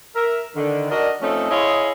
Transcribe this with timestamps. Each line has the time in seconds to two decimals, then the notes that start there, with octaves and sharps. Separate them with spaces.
0.16 A#4 E5
0.56 D3 D#3
0.90 D4 F#4 A#4 D5 D#5
1.22 F3 A3 C4 C#4 D#4 A4
1.50 E4 G#4 C#5 D#5 F5 C6